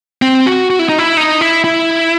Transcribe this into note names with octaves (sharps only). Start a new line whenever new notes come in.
C4
F#4
F#4
E4
D#4
E4
D#4
E4
E4